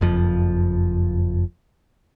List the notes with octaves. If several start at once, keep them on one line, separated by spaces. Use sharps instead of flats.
F#1 F2 F3